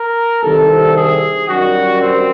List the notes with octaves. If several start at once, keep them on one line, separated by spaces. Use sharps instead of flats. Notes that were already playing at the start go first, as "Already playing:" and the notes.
Already playing: A#4
C2 C3 D#3 A4
G#4
F#2 D#3 G3 F#4
C4